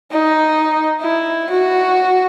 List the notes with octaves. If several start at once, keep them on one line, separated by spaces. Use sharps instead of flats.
D#4
E4
F#4